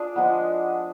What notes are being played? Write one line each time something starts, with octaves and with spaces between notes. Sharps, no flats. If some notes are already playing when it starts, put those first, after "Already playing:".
Already playing: D4 F4 G#4
F3 G#3 B3